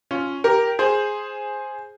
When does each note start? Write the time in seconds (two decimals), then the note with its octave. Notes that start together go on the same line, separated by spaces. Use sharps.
0.11 C#4 F4
0.44 G4 A#4
0.79 G#4 C5